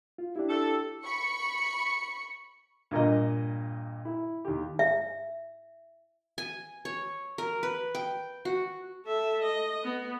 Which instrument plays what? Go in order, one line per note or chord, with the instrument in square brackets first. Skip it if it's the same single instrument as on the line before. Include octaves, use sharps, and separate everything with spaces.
[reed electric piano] F4
[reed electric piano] D4 E4 [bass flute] G4
[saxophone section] A4
[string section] B5 C#6 C#7
[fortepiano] G2 A#2 A#4 D#5
E4
D#2 G4
[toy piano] E5
[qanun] G#5
C#5
A#4
B4
G5
F#4
[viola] A4 E5
D#5
B3